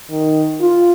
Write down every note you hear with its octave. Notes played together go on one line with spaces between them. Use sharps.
D#3
F4